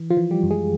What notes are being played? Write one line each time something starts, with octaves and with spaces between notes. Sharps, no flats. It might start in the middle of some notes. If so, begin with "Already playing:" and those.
Already playing: E3
F3 F4
E3
G3 G4
F#2
G#3 G#4